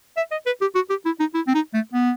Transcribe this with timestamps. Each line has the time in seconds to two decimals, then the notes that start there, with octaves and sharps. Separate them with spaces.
0.17 E5
0.31 D#5
0.46 B4
0.61 G4
0.75 F#4
0.90 G4
1.05 E4
1.20 D#4
1.34 E4
1.47 C4
1.54 D#4
1.74 A3
1.93 B3